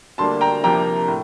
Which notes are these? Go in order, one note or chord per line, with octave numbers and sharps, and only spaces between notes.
D2 D3 G3 A#3 D4 A5 C6
G5 A#5
C2 C3 F3 A#3 D4 G5 A#5
A2